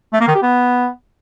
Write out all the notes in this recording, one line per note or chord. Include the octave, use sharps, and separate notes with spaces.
A3
A#3
D#3
G4
B3